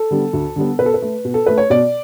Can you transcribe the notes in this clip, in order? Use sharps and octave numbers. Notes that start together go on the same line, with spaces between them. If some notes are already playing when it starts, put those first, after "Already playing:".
Already playing: A4
D3 G3 B3
D2
D3 G3 B3
B2 B4
A4
B4
A3
B2
A4
A3 B4
C#5
B2 D5